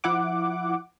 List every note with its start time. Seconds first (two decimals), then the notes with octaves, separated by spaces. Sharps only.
0.04 F3 E4 F#5 D6